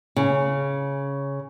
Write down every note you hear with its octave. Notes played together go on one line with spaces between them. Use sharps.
C#3